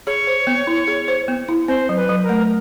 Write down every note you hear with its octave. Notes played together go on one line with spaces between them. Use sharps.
G#4 C#5
C5
B3
E4
G#4
C5
B3
E4
C4 C5
F#3
B4
F#3
A#4
A3